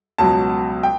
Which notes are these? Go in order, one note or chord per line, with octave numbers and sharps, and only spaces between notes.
C#2 B2 F#3 A5
G5